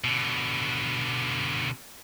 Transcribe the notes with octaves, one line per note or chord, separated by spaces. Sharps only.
B2 D3